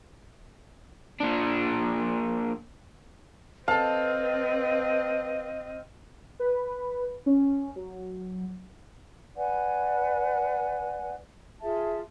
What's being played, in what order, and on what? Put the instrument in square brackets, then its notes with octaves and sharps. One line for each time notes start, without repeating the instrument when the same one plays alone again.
[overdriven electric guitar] A#2 D4
[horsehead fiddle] C4 D#5 [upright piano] A4 A5 [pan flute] B4 [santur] F5
[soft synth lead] B4
C#4
F#3
[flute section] B4 D5 F#5 G#5
F4 G#4 E5 A5